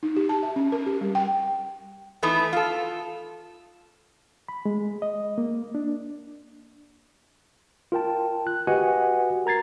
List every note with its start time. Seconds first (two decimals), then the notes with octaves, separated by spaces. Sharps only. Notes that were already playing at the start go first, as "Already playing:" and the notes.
0.03 D#4
0.17 G4
0.29 A5
0.43 E5
0.56 C#4
0.72 A#4
0.86 G4
1.01 G3
1.15 G5
2.23 E3 A3 B3 D#4
2.53 F4 A4
4.48 B5
4.65 G#3
5.02 D#5
5.38 A#3
5.75 D4
7.92 F4 A#4 G5 A5
8.47 F#6
8.67 F#4 G4 B4 D#5 F#5 G#5
9.46 A#4 A#5 G#6 A6 C7